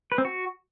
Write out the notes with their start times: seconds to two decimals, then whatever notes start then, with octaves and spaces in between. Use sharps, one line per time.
0.12 B4
0.18 C4
0.25 F#4